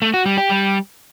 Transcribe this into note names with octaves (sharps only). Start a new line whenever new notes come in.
A3
F#4
G3
G4
G3